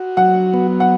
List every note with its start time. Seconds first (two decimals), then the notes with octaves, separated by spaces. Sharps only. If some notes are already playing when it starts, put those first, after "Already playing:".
Already playing: F#4
0.17 F#3 F#5
0.54 B3
0.80 F#5